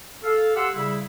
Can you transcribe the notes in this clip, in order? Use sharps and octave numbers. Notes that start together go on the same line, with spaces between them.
A4 F5
G4 F#5 C6 E6
C#3 G3 E4